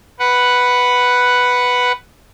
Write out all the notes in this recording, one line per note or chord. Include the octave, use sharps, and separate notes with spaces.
B4 F#5